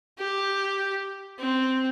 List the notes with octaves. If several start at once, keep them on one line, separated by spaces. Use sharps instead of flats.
G4
C4